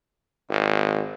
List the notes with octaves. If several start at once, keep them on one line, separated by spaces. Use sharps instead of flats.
G#1